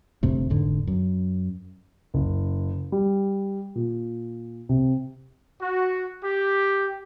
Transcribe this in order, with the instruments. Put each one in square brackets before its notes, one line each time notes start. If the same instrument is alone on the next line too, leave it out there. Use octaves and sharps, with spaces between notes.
[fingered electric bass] G1 F2 C3 A3
F1 G#2 D3
F#2
[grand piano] F#1
G3
A#2
C3
[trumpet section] F#4
G4